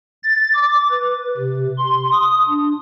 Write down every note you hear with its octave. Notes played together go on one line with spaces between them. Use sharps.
A6
D6
B4
C3
C6
D#6
D4